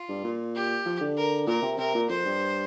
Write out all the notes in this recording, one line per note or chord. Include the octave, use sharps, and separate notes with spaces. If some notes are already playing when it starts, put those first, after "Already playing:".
Already playing: F4
G2
A#2
G4
F3
D3
A#4
A#2 A#4
C3
C3 A#4
A#2
F2 C5
G2